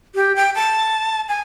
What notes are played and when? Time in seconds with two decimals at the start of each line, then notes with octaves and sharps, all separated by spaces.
0.15 G4
0.36 G5
0.55 A5
1.29 G#5